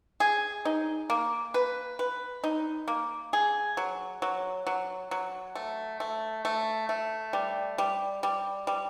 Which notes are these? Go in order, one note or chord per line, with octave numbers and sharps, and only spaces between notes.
G#4
D#4
A#3
B4
B4
D#4
A#3
G#4
F#3
F#3
F#3
F#3
A3
A3
A3
A3
G3
G3
G3
G3